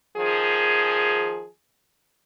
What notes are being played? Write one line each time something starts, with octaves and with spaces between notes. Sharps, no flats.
D#3 F3 G#4